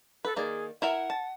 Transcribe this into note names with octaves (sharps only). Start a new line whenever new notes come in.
A4 B4
D#3 A#3 G#4 D5
E4 A#4 E5 F#5
A5